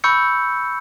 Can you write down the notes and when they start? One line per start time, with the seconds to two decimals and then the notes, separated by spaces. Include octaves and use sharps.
0.04 B5 C#6 E6 G6 C#7